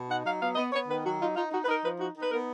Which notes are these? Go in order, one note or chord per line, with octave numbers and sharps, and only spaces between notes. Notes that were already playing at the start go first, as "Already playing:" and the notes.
Already playing: B2
D#4 F#5
F#3 F5
B3 F5
B3 D#5
B3 C#5
D#3 B4
F#3 F#4
D#4 F4
D#4 F4
D#4 F#4
B4
D#4 A#4
F3 B4
D#4 F#4
D#4
B4
B3 A#4